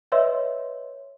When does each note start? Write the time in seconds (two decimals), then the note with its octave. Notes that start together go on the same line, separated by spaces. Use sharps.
0.12 B4 C#5 D#5 E5 C6 E6